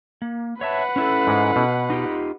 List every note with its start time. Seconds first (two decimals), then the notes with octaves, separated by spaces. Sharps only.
0.22 A#3
0.61 B4 C#5 E5 F#5 A5
0.96 C#4 E4 A4
1.27 G#2 G#3
1.56 B2
1.90 D#4 F4 G4